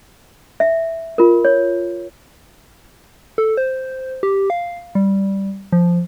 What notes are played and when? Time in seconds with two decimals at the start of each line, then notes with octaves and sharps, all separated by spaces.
0.60 E5
1.18 F4 A#4
1.45 C#5
3.38 A4
3.57 C5
4.23 G4
4.50 F5
4.95 G3
5.73 F3